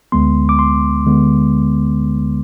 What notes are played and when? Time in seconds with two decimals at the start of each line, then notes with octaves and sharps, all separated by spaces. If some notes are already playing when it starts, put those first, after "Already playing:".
0.12 D2 D3 G#3 B3 C6
0.49 D6
0.59 C6
1.06 D3 G#3 B3